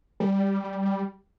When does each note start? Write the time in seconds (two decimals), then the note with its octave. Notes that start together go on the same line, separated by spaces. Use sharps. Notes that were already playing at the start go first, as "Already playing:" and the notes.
0.20 G3